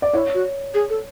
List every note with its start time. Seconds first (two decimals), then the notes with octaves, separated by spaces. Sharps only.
0.02 D5
0.13 E4 C#5
0.34 F#4
0.74 G#4
0.90 A4